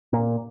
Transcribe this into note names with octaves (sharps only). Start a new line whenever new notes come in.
A#2